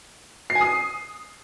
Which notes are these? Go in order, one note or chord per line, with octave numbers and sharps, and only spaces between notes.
C7
G#5
D#6